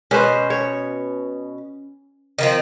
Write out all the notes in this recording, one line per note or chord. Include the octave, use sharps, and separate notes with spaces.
B2 C#4 B4 C5
C#5
D#3 F3 C4